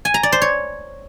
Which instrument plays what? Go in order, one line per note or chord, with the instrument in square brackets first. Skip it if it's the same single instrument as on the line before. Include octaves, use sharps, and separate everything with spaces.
[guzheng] G#5
A#5
D5
C5
C#5